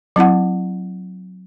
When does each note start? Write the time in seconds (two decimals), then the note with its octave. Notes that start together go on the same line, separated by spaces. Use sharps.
0.16 F#3 C4 E4 F#5